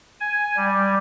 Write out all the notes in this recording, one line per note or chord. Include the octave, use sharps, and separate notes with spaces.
G#5
G3